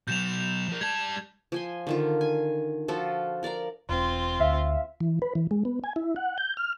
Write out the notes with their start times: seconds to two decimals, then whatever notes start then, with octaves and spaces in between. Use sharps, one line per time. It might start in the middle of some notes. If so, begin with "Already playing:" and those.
0.08 B2 F#3 G6 E7 F7
0.68 F3 A#4
0.81 G3 A5 G#6
1.52 F3 G#5 C6
1.87 D3 D#3 F4
2.21 G#5
2.88 F3 F4 F#4 A4
3.43 A#4 D5 F5 A#5
3.89 E1 C4 F4
4.39 D2 E5 F5
5.00 E3
5.22 B4
5.35 E3
5.51 G#3
5.65 B3
5.84 G#5
5.96 E4
6.16 F#5
6.38 G6
6.57 F6